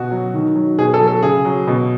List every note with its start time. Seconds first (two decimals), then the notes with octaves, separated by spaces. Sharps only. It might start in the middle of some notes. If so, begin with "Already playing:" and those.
Already playing: B2 F#4
0.11 F#3
0.34 D#3
0.56 F#3
0.78 B2 G#4
0.94 A4
1.01 F#3
1.07 A4
1.23 C#3 G#4
1.45 F#3
1.67 B2